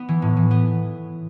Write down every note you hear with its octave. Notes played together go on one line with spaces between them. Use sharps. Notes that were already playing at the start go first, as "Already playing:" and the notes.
Already playing: B3
E3
A2
E3
B3